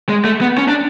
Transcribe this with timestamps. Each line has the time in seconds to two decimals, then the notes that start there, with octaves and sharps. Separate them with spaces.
0.09 G#3
0.25 A3
0.41 B3
0.58 C#4
0.69 D4